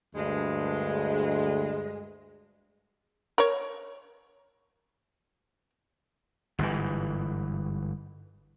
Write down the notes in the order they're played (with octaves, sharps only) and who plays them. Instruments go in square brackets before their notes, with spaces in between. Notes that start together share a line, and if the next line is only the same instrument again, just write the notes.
[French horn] D2 [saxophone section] G2 G#3
[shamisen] A#4 C#5
[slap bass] G1 G#2 C#3 E3